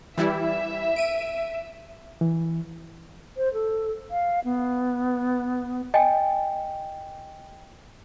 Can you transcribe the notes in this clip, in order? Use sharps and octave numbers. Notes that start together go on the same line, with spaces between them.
E3 G3 E4 E5
D7 D#7
E3
C5
A4
F5
B3
D#5 G5 G#5